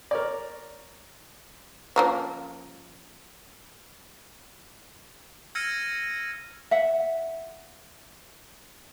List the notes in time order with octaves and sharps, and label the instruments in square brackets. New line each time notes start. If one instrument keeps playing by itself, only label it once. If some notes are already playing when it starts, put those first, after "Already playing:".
[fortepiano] A#4 C#5 D5
[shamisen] F3 A#3 C#4
[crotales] E6 F6 G#6 A#6 C#7 D#7
[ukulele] E5 F#5